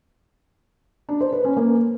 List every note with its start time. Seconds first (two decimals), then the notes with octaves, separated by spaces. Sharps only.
1.09 D4
1.21 C5
1.33 B4
1.45 C#4
1.57 A#3